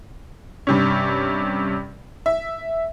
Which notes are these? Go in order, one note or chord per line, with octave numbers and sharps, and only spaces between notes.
G2 C3 C#4
E5